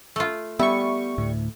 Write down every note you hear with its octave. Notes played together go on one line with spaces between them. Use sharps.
A3 F4
G3 B3 E4 E5 C#6
D2 A2